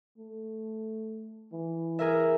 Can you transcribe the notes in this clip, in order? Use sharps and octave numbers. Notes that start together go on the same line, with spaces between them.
A3
E3
G#4 A#4 E5